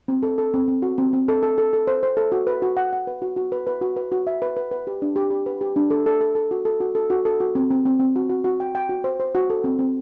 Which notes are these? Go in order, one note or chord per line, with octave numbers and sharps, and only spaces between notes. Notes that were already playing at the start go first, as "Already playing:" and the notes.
C4
A4
A4
C4
C4
F#4
C4
C4
A4
A4
A4
A4
C5
C5
A4
F#4
B4
F#4
F#5
F#5
B4
F#4
F#4
B4
B4
F#4
B4
F#4
E5
B4
B4
B4
G4
D4
G4
G4
B4
G4
D4
A4
A4
A4
A4
F#4
A4
F#4
A4
F#4
A4
F#4
C4
C4
C4
C4
F#4
F#4
F#4
G5
G5
F#4
C5
C5
F#4
A4
C4
C4